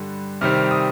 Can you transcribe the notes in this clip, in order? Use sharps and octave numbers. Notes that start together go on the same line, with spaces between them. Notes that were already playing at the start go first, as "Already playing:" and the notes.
Already playing: G2 D3 G3
C3 D#3 G3 C4 F6
F6
D#6